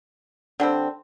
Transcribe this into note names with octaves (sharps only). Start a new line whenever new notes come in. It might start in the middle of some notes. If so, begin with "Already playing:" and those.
D3 G3 C4